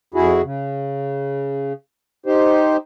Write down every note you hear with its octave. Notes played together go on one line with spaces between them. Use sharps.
F2 E4 F#4 G#4
C#3
D#4 G4 C5